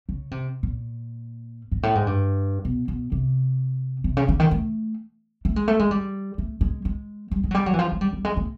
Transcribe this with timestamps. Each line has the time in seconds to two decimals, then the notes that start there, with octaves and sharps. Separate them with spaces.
0.09 C#3
0.31 C3
0.63 A#2
1.72 G#2
1.83 A2
1.95 G#2
2.07 G2
2.65 B2
2.88 B2
3.12 C3
4.04 C3
4.17 C#3
4.29 D3
4.40 D#3
4.51 A3
5.45 A3
5.56 G#3
5.68 A3
5.79 G#3
5.91 G3
6.38 A3
6.61 G#3
6.85 G#3
7.31 G3
7.44 G#3
7.51 F#3
7.54 G3
7.66 F#3
7.74 E3
7.79 F3
7.92 G#3
8.01 G3
8.13 G3
8.25 G#3
8.37 A3